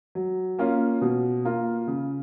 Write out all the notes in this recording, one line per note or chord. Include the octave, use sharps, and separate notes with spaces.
F#3
A#3 C#4 F4
B2
A#3 F4
C#3